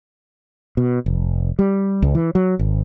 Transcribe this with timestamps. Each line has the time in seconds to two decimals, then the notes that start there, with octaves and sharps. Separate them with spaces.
0.77 B2
1.06 F1
1.59 G3
2.02 C#2
2.15 E3
2.35 F#3
2.59 G#1